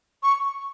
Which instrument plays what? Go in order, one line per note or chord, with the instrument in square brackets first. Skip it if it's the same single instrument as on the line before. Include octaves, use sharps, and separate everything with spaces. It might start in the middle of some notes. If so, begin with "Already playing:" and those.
[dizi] C#6